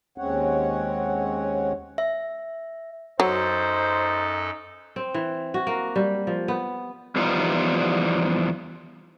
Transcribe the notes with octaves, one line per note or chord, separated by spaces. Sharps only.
D#2 G#3 C4 C#4 C#5 F#5
E5
F#2 F#3 D#4 A4 C5
C4
E3
F#4
A#3
G3
F3
B3
E2 F3 G3 B3 D#4 F4